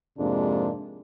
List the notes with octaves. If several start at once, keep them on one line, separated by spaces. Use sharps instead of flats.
F2 G#2 C3 G#3 A#3 D4